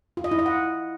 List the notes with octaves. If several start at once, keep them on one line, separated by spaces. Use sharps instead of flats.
F4
D#5
E4
D#5
F#5